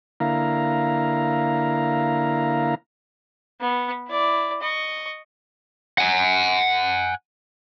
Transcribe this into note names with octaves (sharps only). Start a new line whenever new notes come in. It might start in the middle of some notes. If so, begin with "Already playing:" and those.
D3 A#3 E4 F5 A#5
B3
E4 D5
D#5 C#6
F#5 G#5